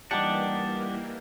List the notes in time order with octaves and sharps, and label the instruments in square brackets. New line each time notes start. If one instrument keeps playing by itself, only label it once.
[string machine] E3 A#3 [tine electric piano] G3 F#5 C#7 [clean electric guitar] D4 [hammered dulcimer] D#4 G4